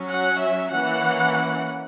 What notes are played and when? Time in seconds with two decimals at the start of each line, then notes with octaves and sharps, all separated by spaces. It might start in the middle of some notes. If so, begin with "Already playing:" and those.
Already playing: F#3 C#4
0.10 F#5
0.41 E5
0.73 E3 A#3 C#4 F#5